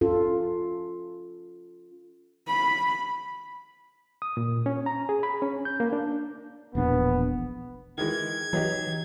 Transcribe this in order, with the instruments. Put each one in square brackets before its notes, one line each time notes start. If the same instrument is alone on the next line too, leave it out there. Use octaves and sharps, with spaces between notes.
[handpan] C#4 F4 A4
[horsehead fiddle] B5
[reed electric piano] D#6
A#2
C#4
A#5
G#4
B5
C#4
G6
A#3
D4
[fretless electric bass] E1 A#1 D4 [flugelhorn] B3
[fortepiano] D#3 E3 G#3 [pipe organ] G#6
[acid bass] E3 [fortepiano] F#3 D#4 G4